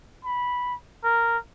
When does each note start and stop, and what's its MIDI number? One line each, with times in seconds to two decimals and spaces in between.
0.25 0.75 83
1.04 1.38 70